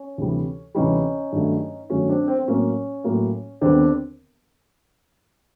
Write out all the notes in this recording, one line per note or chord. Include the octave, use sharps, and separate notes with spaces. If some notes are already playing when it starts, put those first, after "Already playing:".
Already playing: C#4
D2 C3 E3 G3
D2 C3 E3 G3 C#4 D#4
G2 D#3 F#3 A3
G2 D#3 F#3 A3 C#4
C4 D4
C4
C4
A2 F#3 A#3 C#4
A2 F#3 A#3
D#2 D3 G3 B3 C4 D4